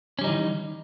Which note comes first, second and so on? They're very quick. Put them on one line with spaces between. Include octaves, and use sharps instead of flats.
C#4 G3 D#4 E3 D#3